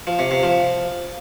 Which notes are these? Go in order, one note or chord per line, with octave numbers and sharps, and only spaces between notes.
F3
C3
C3
F3